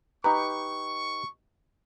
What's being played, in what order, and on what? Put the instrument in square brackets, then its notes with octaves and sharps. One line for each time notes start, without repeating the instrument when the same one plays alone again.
[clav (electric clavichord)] D#4 G4 B4 [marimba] A#5 [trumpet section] C#6